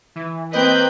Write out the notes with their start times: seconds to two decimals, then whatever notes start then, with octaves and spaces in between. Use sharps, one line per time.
0.16 E3
0.53 A#3 C4 B4 D#5 G5 G6